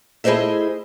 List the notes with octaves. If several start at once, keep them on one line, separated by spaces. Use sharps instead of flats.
A3 E4 G#4 C5 D#5 E5